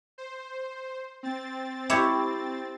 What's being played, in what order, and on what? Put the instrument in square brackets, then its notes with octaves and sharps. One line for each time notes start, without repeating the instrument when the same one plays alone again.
[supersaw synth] C5
C4 A6
[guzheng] E4 G4 C#5